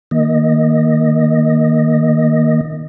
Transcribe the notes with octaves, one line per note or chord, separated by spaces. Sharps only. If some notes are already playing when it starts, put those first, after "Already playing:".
D#3 A#3 D#5